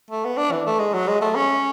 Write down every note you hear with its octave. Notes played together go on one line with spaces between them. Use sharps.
A3
B3
D4
E3
A3
G#3
F#3
G#3
A3
C#4